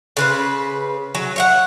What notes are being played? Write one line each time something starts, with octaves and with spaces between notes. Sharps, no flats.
C#3 B4 C5
F#3
C#5 E5 F#5